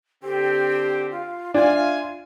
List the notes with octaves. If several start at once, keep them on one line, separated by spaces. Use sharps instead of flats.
D3 C4 G4
F4
D4 F4 E5 F5 G#5